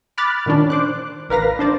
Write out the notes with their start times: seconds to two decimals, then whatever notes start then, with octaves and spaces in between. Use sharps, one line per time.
0.18 B5 D6 F6 F#6 A6
0.46 A#2 D#3 C#4 D4
0.70 C5 D6 F#6
1.29 A1 A#4 B4 F5 A#6
1.59 D4 C5 D5